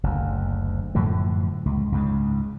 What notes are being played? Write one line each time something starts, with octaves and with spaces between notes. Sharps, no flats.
F#1 D2
F#2 A2 D3 F3
C#2
C#2 G#2 C#3